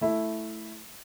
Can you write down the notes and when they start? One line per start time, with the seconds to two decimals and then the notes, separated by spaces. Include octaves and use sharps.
0.01 A3 E4